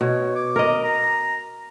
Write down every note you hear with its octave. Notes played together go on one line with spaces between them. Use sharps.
B2 C#5
D6
A#4 D#5
A#5